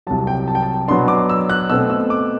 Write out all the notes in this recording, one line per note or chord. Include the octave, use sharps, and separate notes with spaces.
C2 C3 F#3 A5
G5
A5
G5
A5
B2 F#3 B3 D4 C6
D6
E6
F#6
B2 A3 C4 E6
E6
D6